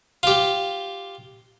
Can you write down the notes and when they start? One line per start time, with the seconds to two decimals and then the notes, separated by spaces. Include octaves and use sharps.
0.23 F4 G4